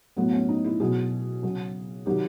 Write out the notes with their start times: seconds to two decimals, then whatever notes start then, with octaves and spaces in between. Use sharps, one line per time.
0.17 A2 F#3 B3
0.32 C#4
0.48 D#4
0.65 E4
0.80 B2 F#3 G#4
1.43 C#3 F#3
2.06 C3 D#3 F#3 G4